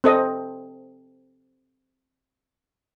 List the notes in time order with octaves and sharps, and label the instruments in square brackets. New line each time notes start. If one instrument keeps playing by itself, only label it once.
[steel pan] C4 A4 D#5